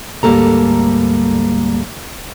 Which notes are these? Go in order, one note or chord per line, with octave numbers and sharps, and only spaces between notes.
D2 G#2 G3 A#3 A4 A#5